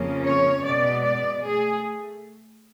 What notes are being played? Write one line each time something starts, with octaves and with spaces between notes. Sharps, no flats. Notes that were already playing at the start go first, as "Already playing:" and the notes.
Already playing: F2 C#3 F3 A#3 C#4
C#5
B2 G#3 B3 D5
D5
A3 G#4